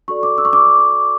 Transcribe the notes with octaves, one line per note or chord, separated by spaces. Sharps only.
F#4 A4 D5 C#6
D6
E6
C#6
D6